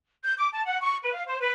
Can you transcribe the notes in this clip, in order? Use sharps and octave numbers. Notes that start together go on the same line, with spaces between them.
G6
D6
A5
F#5
C#6
B4
F5
C5
B4